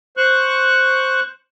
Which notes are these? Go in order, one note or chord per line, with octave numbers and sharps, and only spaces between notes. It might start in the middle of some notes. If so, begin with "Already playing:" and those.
C5 C#6 F#6